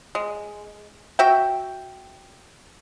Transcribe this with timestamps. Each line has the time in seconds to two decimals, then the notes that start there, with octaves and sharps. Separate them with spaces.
0.15 G#3
1.19 F#4 E5 G5